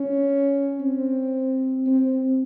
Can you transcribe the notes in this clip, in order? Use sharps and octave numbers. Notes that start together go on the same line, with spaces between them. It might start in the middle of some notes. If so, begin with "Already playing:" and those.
Already playing: C#4
C4
C4